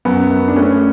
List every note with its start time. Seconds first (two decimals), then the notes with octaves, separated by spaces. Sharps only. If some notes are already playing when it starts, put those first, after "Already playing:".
0.05 F#2 B3
0.31 F#2
0.48 D4
0.56 A3 C#4